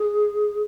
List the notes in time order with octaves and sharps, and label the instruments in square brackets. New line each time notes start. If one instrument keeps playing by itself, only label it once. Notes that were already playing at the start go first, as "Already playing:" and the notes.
Already playing: [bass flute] G#4